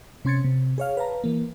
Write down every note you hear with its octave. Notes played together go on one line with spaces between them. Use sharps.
C3 C#4 C6 G#6 A6 C#7
C3
G#4 C#5 F5
B4 F5 A5 A#5
E3 A#3